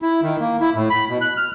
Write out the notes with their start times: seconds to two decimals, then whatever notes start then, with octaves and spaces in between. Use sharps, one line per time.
0.02 E4
0.22 D#3
0.40 A#3
0.61 E4
0.75 A2
0.90 B5
1.09 B2
1.21 F#6
1.37 F6